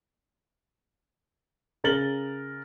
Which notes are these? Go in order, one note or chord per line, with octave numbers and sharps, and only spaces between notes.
C#3 A#4 A6 F#7 G7